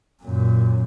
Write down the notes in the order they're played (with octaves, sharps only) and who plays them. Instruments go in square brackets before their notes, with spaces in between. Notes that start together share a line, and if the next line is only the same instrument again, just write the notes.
[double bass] F#2 A#2